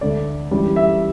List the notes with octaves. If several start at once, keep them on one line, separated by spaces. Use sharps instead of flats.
D2 D3 A3 D5
F#2 E3 G3
E5